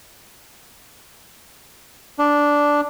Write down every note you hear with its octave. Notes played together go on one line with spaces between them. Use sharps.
D4